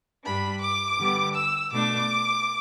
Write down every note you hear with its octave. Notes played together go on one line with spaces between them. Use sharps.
G2 G3 D4 B5
D6
D3 G3 B3
E6
B2 A3 D4 D6